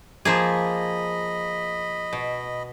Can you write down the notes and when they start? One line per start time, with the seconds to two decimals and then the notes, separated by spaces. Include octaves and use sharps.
0.25 F3 A#3 G#4 D#5 B5
2.13 B2